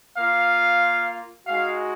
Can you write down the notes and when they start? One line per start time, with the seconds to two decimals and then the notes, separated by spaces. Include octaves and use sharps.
0.17 A#3 F4 F5
1.47 G#3 D#4 F#4 F5